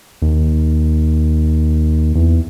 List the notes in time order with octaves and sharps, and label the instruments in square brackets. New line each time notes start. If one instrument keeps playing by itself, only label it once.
[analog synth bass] D#2
E2